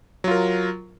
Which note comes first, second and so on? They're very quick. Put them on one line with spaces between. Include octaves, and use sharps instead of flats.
F#3 F4 A#4